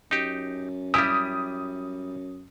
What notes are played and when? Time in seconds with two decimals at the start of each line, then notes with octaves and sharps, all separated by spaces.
0.11 F#2 D#4 G4
0.94 G3 E4 G4 D#6